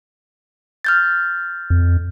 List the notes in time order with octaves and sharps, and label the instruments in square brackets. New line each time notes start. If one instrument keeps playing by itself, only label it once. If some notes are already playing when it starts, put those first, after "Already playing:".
[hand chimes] F6 G6 A6
[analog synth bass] F2